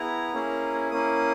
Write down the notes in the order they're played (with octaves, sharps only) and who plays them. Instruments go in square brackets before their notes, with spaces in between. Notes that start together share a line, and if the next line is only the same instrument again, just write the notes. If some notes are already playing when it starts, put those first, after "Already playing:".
Already playing: [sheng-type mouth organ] B3 E4 G#4 A#5
A#3 C#4 E4 G#4
A#3 C#4 E4 D#6